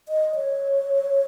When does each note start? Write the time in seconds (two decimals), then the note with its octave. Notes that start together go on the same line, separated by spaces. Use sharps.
0.08 D#5
0.35 C#5